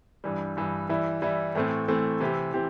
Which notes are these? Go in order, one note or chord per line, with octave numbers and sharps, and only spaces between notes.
G2 E3 G3
G2 E3 G3
E3 G3 E4
E3 G3 E4
A2 E3 A3 C4
A2 E3 A3 C4
C3 E3 C4 E4 G4
C3 E3 C4 E4 G4